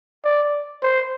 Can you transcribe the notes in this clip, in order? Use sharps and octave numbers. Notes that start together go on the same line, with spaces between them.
D5
C5